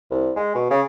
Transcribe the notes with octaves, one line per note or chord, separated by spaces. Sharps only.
C2
G#3
B2
C#3